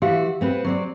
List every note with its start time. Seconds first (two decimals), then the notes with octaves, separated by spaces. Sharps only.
0.02 E3 F#4 G4 F5
0.41 B3 C4 B4
0.64 F#3 C4 D5